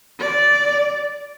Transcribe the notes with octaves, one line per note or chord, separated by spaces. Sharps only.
D5